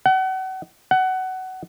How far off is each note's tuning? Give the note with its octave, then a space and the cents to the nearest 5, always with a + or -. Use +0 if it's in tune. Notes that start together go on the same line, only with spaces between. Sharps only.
F#5 +35
F#5 +20